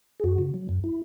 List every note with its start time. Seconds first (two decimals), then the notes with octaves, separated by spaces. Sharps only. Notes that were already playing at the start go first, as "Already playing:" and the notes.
0.20 G#4
0.24 F#2 F#4
0.38 C#3
0.54 F#3
0.69 F#2
0.84 E4